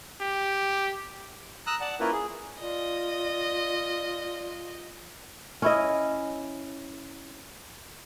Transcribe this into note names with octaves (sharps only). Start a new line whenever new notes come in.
G4
A#5 D#6 E6 F#6
D5 F#5 A5
A#3 C#4 E4 F4 A#4 B4
G#4
F4 D5 D#5
C#4 E4 D#5